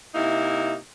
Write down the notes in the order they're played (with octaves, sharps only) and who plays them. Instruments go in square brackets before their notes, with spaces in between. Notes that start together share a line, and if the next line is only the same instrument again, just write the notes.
[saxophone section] C3 A#3 D#4 E4